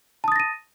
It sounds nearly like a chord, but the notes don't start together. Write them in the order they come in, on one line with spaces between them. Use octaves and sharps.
A5 D#6 A6 A#6 D#7